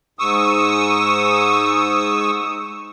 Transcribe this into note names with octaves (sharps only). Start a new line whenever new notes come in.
G#2 C#6 D#6 E6